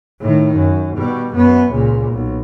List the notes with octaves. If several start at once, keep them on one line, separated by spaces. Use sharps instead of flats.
A2 D#3
F#2
B2 G3
F#2 B3
C#2 A#2
B1